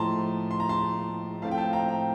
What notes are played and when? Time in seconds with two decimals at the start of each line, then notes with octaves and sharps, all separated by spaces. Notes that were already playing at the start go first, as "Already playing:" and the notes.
Already playing: A2 F3 A3 A5 A#5 C6
0.51 C6
0.60 A#5
0.69 A5 C6
1.42 A2 F3 A3 C4 F5 A5
1.51 G5
1.58 F5 A5
1.73 G5 A#5
1.88 G5 A#5